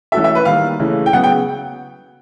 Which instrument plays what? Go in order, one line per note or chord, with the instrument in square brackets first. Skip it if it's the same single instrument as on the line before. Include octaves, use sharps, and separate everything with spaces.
[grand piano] E3 A3 C#4 F#4 A4 [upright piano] E5
[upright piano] E5
B4
[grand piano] D#3 G3 A#3 [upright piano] F5
[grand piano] C#3 E3 A3
[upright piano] G5
[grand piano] C#3 F#3 B3 [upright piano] F#5
[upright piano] G5